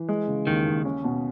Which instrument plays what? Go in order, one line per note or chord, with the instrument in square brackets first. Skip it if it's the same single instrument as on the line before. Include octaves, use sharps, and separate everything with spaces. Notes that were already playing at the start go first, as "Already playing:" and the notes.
Already playing: [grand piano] E3
G#3
C#3
[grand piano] D#2 [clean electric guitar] D#3
[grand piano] D#2
C#4
B2